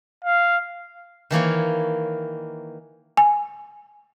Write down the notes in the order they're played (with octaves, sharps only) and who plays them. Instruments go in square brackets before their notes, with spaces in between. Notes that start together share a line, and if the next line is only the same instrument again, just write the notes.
[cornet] F5
[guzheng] D#3 E3 A#3 C#5
[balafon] G#5